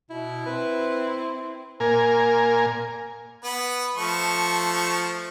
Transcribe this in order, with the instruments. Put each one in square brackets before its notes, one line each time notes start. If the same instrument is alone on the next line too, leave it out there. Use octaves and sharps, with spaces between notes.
[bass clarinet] B2 [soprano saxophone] E4
[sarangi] C4 [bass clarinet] B4
[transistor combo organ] A#2 A#4 G#5
[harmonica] B3 B4
F3 A3 C#6